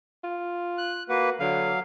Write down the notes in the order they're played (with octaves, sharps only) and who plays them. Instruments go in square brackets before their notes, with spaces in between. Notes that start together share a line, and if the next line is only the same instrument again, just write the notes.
[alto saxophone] F4
[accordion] F#6
[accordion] A#3 B4 [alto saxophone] F#4
[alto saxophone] D3 [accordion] F#3 F5